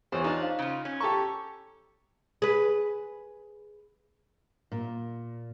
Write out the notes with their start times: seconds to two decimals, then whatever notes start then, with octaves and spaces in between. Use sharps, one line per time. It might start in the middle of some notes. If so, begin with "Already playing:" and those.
0.12 E2 E3 G4 C5 C#5 C#6
0.24 D4 D#4 F4
0.40 C5 F5
0.59 C#3 F4
0.85 C#4
1.00 G4 A4 A#5 C#6
2.42 G#4 B4
4.72 A#2